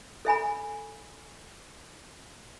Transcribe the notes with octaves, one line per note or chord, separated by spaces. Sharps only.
A4 E5 G#5 B5